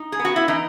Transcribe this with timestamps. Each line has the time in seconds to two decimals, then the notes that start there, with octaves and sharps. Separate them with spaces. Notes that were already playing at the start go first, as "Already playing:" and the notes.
Already playing: D#4
0.12 G#4
0.19 B3
0.25 F#4
0.36 E4
0.48 E3 D#4